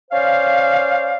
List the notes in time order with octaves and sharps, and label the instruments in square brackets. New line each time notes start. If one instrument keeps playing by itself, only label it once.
[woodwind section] C#4 C5 D5 F5